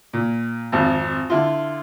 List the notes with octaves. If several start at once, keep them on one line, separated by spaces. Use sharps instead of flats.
A#2
G#1 F2
D3 E4 F4